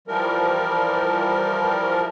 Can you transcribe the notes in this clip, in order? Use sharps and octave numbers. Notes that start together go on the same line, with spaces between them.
E3 F3 G3 A#4